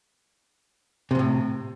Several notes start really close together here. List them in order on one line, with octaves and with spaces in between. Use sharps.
C3 E2 A2